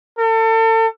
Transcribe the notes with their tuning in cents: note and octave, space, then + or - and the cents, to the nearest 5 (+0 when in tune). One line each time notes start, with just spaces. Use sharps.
A4 +35